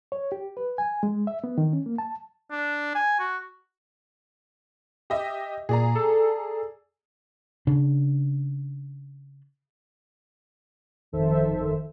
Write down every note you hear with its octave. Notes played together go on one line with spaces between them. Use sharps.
C#5
G4
B4
G#5
G#3
E5
B3
D#3
C#4
A#3
A5
D4
G#5
F#4
G4 D#5 E5
A#2 G#4 D5 A#5
A4
C#3 D4
G1 F2 D#3 A4 C5 E5